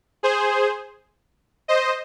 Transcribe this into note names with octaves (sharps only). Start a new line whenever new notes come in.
G#4 C5
C5 D#5